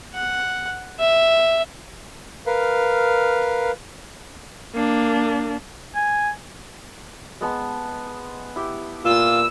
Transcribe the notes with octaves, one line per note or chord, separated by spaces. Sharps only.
F#5
E5
A#4 B4 F5
A#3 D4
G#5
G#3 B3 A5
E4 G4
A#2 F4 E6